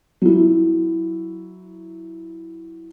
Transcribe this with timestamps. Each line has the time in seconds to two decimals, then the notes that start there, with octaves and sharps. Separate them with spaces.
0.22 F#3 E4